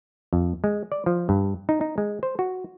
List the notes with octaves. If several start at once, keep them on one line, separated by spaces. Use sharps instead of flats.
F2
G#3
D5
F3
G2
D#4
D#4
G#3
C5
F#4